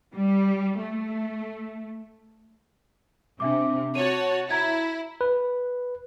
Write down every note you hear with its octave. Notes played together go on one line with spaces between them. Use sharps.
G3
A3
C3 D4 E5 D6
F#4 C#5 A5 D#7
E4 A#5 G#6
B4